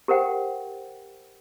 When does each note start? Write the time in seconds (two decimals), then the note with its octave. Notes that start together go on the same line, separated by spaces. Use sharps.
0.08 G4 A#4 C5 F#5 G5